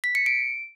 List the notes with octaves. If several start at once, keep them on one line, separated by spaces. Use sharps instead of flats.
B6
C#7
D7